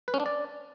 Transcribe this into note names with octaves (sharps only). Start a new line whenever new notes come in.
B4
C#4
D4
D5